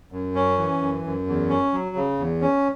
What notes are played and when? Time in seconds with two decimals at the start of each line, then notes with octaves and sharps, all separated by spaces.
0.12 F#2
0.35 C#4
0.58 E3
0.81 F#2
1.04 F#2
1.27 E2
1.49 C#4
1.73 F#3
1.96 C#3
2.19 E2
2.41 C#4